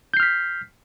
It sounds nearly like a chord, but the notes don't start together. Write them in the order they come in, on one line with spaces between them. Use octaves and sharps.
G6 C7 F6 B6